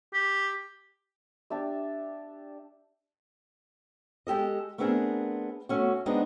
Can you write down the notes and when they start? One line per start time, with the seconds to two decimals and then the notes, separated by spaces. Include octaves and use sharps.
0.13 G4
1.50 D4 G4 E5
4.27 G#3 G4 A4 D#5
4.78 A3 B3 C4 D4 G#4 A#4
5.69 A3 C#4 F#4
6.06 G#3 B3 C4 D4 D#4